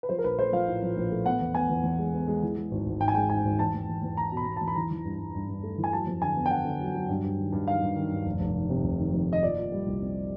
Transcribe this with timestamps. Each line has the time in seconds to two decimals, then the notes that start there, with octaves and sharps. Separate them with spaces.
0.03 B4
0.09 F3 C5
0.18 A#4
0.24 A#1 B4
0.38 A3 C5
0.53 F3 F5
0.68 A2
0.82 F3
0.97 A#1
1.12 A3
1.26 B3 F#5
1.40 E2
1.55 B3 G#5
1.70 E2
1.84 E2
1.99 G#3
2.13 B3
2.28 G#3
2.43 E3
2.57 G#3
2.71 G#1
2.86 G#1
3.00 G#2 G5
3.08 G#5
3.15 G#3 G5
3.30 G#2 G#5
3.45 G#1
3.59 E2 A5
3.74 E2
3.89 E2
4.03 E2
4.17 E2 A#5
4.32 B2
4.37 B5
4.47 B2
4.56 A5
4.61 E2
4.68 B5
4.76 E3 A#5
4.91 E3
5.04 G2
5.19 G2
5.35 G2
5.49 G2
5.63 A3
5.78 E3
5.84 G#5
5.92 F#3 A5
6.07 F2
6.21 D3 G#5
6.37 B3
6.46 G5
6.51 D3 F#5
6.65 D3
6.80 F#3
6.95 F#3
7.09 G2
7.24 G2
7.38 D#3
7.52 G2
7.68 D#3 F5
7.81 G2
7.96 D#3
8.11 G2
8.26 F1
8.40 F1
8.56 D#3
8.70 C3
8.84 F1
8.99 D#3
9.14 F2
9.28 D#3 D#5
9.42 A#2 D5
9.56 A#2
9.72 G3
9.86 C2
10.01 C4